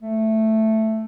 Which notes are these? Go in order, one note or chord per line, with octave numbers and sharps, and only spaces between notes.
A3